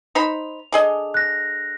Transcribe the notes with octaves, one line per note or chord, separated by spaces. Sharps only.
D#4 C5 B5 F7
D3 G#4 D#5
F#6 A#6